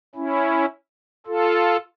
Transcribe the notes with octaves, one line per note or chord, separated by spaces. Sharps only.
C#4 E4
F4 A4